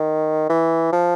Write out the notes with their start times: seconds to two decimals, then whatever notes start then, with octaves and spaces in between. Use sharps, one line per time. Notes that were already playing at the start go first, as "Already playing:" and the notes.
Already playing: D#3
0.50 E3
0.93 F3